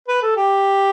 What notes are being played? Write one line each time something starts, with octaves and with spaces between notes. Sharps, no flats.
B4
A4
G4